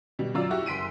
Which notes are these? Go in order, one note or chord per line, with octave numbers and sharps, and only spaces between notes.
B2 G3
F#2 F#3 F4 D5 A#5 E6
E4 F#4 G4
F#1 C6 B6 D7 D#7